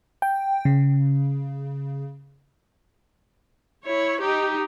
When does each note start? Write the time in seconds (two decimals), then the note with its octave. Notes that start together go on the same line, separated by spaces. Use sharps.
0.22 G5
0.65 C#3
3.85 E4 C#5
4.21 D#4 G4